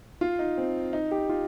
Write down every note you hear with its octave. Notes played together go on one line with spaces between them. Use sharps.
F4
D#4
C4
D#4
G4
F4